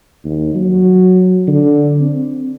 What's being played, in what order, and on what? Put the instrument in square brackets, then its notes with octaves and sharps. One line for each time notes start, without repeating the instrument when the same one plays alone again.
[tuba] D#2
F#3
D3
C4